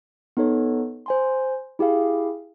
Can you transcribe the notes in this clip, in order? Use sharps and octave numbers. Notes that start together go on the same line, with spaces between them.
B3 D#4 A4 C#5
C5 G#5 C6
E4 G4 G#4 F5